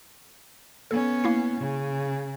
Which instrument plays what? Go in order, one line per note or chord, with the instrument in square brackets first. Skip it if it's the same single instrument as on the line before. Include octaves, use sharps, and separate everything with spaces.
[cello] B3 C#4 [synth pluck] A4
[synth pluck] A#3 E4 C7
[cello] C#3